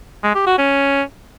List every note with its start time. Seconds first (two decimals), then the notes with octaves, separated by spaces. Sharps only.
0.24 G#3
0.35 G4
0.47 F#4
0.58 C#4